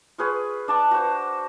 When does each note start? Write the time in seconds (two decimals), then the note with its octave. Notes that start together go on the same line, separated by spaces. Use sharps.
0.18 F4 G#4 B4 C#5
0.68 D4 A5 D6
0.91 F#4 C5